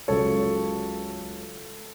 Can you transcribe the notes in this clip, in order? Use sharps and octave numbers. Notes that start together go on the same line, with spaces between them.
C#2 C#3 F#3 A4 C#5